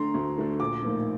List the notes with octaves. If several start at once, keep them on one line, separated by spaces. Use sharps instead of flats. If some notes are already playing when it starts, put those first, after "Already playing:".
Already playing: D3 A3 D4 A#5 C6
D2
D3 A3 D4
A#1 D6
A2 F3 A#3 D#4